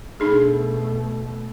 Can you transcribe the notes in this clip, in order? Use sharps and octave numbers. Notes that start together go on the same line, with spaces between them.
B2 A3 D4 D#4 G#4